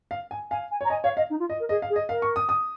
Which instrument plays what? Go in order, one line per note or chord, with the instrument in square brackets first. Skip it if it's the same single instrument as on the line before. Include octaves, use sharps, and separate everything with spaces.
[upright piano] F5
G#5
[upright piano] F5 [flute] G#5
[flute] G#5
[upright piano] C#5 [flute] A#5
[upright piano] D#5 [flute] G#5
[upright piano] C#5 [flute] F5
[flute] D#5 [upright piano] F5
[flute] D#4
F4
[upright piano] D#5
[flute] A#4
[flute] G#4 [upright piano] D#5
[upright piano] F5
[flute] G#4
[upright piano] D#5
[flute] A#4 [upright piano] F5
[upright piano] C#6
D#6
D#6